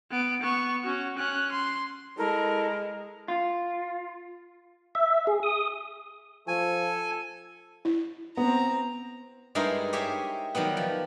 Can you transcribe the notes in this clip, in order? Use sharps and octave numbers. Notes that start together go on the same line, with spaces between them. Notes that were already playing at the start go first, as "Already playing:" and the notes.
B3 D7
B3 C#6
C#4 F#4
C#4 F#6
C6
G#3 E4 A4 A#4
F4
E5
G#4
D#6
F3 A4 G#5
E4
B3 C4 A#5
G2 G#3 D#4 E4 A#4 C6
G4 C5 C#5 D#5 E5 G#5
D#3 F#3 G3 B3
F3